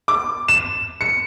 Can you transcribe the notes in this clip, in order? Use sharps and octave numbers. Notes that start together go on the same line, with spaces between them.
D6
E7
C#7